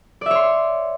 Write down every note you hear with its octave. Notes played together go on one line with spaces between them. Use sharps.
C#5 D5 E5 C6